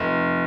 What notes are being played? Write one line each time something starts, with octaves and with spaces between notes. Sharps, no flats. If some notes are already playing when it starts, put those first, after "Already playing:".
Already playing: F1